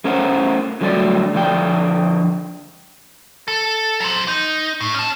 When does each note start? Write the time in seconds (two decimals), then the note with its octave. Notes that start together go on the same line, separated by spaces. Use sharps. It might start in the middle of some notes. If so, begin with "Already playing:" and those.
0.04 A3 C#4 A#4 C5 F#5
0.81 D3 F#3 G3 A3 A#4 D5
1.34 D3 F3 D5 G5
3.48 A4
4.00 F#3 C5
4.28 D#4
4.81 A2
4.94 C#4 A5